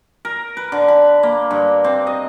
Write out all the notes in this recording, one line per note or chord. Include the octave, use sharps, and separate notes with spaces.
A#4
B4
D3
B5
A#3
G2
C4
D#5